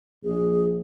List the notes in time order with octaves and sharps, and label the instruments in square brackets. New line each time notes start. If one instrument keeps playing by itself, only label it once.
[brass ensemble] A#1 [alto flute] G#4